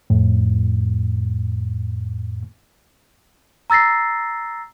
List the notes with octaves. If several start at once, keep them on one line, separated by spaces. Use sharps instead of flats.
F2 A2
A#5 E6 A6 A#6 C7